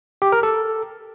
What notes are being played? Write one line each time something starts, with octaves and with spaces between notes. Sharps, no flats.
G4
A#4
A4